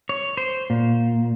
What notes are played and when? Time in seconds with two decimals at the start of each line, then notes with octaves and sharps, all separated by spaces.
0.09 C#5
0.37 C5
0.70 A#2